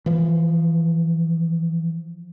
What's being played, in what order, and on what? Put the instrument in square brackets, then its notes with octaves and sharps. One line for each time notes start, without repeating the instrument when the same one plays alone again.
[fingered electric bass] E3 F3